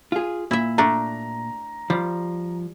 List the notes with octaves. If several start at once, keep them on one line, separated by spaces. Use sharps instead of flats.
F4 G#4
A#2 E4 E5
A3 D4 A#5
F3 G3